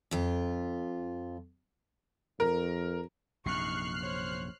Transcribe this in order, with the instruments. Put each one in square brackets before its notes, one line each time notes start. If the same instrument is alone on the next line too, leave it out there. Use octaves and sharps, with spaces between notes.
[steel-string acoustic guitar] F2 F4
[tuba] F2 [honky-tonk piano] A#4
[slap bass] A#1 F#2 C3 [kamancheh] D#4 C#6 [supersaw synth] F6 F#6 C7
[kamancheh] C5 C#5